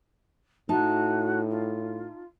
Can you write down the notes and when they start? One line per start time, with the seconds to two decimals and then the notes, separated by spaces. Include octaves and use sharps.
0.69 A2 D#4 F#4 E5 A5
1.50 F4